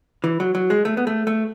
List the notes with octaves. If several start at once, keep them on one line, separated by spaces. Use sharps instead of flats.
E3
F#3
F#3
G#3
A3
B3
A3
A3